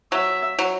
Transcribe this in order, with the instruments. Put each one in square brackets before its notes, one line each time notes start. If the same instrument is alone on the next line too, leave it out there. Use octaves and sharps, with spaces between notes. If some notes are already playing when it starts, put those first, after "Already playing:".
[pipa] F#3 [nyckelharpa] E5
[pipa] F#3